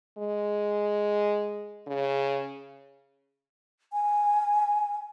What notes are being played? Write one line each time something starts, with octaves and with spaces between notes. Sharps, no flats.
G#3
C#3
G#5